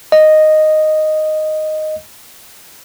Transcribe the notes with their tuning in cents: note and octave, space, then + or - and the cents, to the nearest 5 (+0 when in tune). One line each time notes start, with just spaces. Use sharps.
D#5 -5